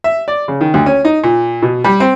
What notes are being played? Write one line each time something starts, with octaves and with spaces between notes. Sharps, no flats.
E5
D5
C#3
D#3
D2
C#4
D#4
A#2
B2
G3
C4